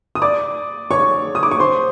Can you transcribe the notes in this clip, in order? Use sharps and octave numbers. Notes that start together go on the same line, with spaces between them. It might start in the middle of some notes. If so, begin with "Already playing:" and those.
D#6
D5 D6
C#5 C#6
D#6
D6
C#6
C5 C6